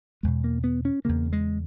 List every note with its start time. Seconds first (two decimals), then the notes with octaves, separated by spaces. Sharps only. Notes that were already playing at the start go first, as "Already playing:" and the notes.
0.23 E2 B2 G#3
0.44 A#3
0.64 B3
0.85 C#4
1.05 E2 C#3 A#3
1.33 G#3